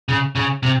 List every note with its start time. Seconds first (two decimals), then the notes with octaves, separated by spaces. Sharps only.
0.09 C#3
0.35 C#3
0.63 C3